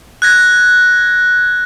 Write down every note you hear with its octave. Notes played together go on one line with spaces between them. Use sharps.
F#6 G#6 A#6